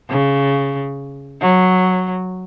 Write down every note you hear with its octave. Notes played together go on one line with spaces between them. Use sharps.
C#3
F#3